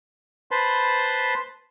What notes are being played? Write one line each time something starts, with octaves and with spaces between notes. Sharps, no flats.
B4 C5 A5 B5 C6